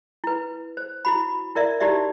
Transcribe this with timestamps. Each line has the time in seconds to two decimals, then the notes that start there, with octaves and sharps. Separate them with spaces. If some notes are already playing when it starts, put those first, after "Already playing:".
0.24 E4 B4
0.77 C5
1.05 E4 F#4 B5
1.55 E4 A#4 D5 E5
1.80 D#4 E4 F#4 G4 D5 E5